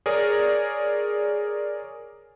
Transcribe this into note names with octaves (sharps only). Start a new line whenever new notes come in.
G#4 A#4 C#5 D5